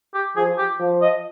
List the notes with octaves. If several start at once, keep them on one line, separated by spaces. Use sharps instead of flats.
G4
F3 G#4
G4
F3
D#5